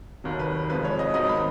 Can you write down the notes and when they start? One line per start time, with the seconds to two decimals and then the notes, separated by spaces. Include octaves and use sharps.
0.24 F1 D#2 D#3 F#3
0.39 B4
0.70 F1 F2 F3 G#3 B4
0.85 C#5
0.99 D#5
1.14 G#2 D#3 F#3 B3 D#4 D#5
1.29 B5